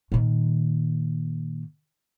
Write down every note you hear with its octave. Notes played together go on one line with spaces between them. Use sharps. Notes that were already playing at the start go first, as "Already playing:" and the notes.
A#2 D#3